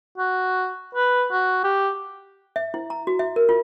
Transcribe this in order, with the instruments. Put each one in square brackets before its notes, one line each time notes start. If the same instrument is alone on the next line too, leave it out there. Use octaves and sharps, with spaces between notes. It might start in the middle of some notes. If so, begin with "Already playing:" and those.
[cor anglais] F#4
B4
F#4
G4
[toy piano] E5
E4
A#5
F#4
E5
A#4
F4